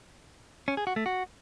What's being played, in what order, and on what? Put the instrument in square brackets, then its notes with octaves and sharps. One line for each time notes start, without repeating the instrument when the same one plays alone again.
[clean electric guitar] C#4
G#4
F#4
A3
F#4